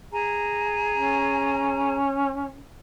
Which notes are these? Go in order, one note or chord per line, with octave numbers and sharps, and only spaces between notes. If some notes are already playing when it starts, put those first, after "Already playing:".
G#4 G#5 A#5
C#4